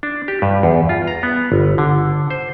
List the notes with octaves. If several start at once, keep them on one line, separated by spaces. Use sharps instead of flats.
D4
G4
G2
E2
F4
A#5
B3
G1
D3
C5